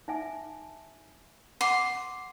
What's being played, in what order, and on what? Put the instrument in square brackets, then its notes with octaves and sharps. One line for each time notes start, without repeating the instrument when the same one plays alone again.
[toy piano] D#4 E5 G#5
[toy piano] F#5 D6 [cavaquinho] C6